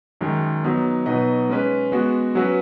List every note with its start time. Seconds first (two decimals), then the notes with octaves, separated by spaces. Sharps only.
0.21 F#2 D#3 G#3
0.64 F#3 B3 D#4
1.06 B2 F#3 D#4 B4 D#5
1.49 G#3 C#4 B4
1.92 G#3 B3 F#4
2.35 F#3 C#4 F#4 B4